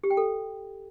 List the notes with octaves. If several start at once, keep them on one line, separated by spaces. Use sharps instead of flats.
G4
G5
A4